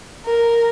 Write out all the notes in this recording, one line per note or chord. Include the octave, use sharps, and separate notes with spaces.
A#4